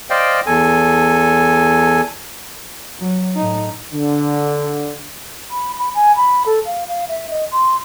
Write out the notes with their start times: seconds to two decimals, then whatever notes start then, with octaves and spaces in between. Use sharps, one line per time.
0.10 C5 D5 D#5 F5 G5
0.47 E2 A4 G#5
2.99 F#3
3.36 A2 D#4
3.93 D3
5.51 B5
5.79 B5
5.95 G#5
6.16 B5
6.46 A4
6.66 F5
6.88 F5
7.09 E5
7.31 D#5
7.52 C6